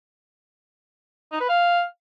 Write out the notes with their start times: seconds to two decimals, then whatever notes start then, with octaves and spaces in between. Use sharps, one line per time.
1.32 D#4
1.41 B4
1.49 F5